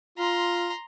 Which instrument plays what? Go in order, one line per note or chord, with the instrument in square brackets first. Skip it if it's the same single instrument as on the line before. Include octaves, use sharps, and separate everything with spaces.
[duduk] F4 [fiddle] A#5 C6